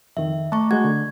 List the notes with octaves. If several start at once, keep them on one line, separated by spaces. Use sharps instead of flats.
F2 D#3 E5
A3 A5 C#6
G#3 F#4 G#6
D3